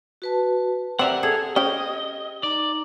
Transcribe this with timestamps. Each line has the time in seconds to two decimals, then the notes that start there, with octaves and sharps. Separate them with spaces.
0.22 F#4 B4 A5
0.99 C4 G4 A#4 D5 E5 F#5 A#5
1.23 G#4 A4
1.56 C#4 C5 D#5 G5
2.43 D#4 D5 A#5